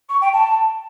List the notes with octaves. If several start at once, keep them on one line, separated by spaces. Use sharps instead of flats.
C#6
G5
A5